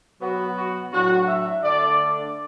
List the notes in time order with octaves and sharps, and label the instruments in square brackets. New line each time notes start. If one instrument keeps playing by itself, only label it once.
[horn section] B2 F#3 B3 F#4
F#4
A2 F#3 D4 F#4
E5
D3 A3 D4 D5